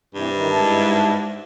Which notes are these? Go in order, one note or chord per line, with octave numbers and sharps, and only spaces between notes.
G2 C3 E3
D#3 E3 D#4
G#2 E4 A5